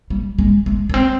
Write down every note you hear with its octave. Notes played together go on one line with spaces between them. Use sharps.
G3
G#3
G#3
A#3
C4